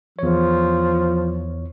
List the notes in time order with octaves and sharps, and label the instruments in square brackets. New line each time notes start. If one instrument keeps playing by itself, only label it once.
[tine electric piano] E2 C#5 [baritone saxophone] F3